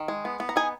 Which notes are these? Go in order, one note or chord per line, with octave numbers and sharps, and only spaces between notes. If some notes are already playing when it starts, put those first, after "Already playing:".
Already playing: D#3
G#3
B3
B3
A#5
D#4 G#4 G#5